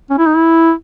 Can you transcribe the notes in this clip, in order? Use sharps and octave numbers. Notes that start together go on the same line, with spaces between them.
C#4
E4
D#4
E4